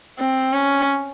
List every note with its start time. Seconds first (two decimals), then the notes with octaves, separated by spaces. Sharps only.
0.19 C4
0.53 C#4